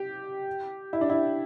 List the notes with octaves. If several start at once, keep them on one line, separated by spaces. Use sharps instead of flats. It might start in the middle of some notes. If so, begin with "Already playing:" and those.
Already playing: G4
E4
D4
E4